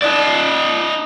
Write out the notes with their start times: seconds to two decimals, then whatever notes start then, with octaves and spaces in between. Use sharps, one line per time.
0.02 D#4 D5